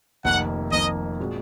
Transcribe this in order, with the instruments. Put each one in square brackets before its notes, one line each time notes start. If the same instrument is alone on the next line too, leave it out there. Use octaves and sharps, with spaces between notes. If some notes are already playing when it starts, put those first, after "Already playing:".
[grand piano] F1 F2 D#3 A#3 [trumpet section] F#5
[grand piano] F1 F2 D#3 A#3 [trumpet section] D#5
[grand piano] A#2 G#3 C4 F#4